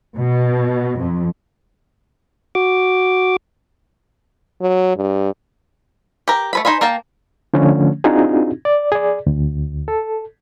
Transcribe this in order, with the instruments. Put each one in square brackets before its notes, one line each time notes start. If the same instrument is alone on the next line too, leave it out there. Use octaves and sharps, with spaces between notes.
[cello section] B2
F2
[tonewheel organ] F#4 D6
[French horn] F#3
G2
[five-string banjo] G4 A#4
A3 B4 B5
D#4 C5 G#5 B5
A#3 A#4 G5 A5
[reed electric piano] D3 F3 A3 C#4
C4 D4 D#4 F4 F#4 G#4
D5
G#4 D5
D2
A4